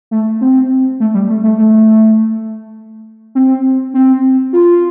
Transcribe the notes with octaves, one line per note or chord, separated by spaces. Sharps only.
A3
C4
A3
G3
A3
A3
A3
C4
C4
F4